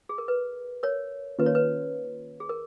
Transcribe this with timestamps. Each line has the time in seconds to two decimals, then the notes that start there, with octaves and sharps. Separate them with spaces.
0.09 G#4
0.18 A#4
0.28 B4
0.83 A#4 C#5
1.39 D#3 A#3 C#4 F4 B4
1.46 C#5
1.55 B4
2.40 G#4
2.49 A#4